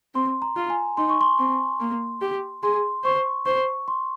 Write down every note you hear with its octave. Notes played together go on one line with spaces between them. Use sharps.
C4 C6
A#5
F4
G#5
D#4 C6
C#6
C6
C4
A#3
G4
G#4 C6
C5 C#6
C5 C#6
C6